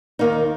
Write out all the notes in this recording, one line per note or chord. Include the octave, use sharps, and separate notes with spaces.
D#2 D#3 A#3 D#4